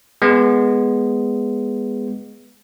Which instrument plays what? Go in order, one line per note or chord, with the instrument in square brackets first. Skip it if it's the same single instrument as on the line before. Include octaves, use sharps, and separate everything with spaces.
[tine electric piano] G#3 B3